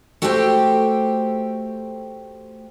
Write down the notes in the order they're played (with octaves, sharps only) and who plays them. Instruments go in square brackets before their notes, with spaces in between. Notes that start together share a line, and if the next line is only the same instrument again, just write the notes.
[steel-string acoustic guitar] A3 F#4 G4 A4 C5 G5